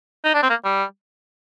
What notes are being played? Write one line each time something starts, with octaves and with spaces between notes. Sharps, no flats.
D#4
D4
C4
A#3
G3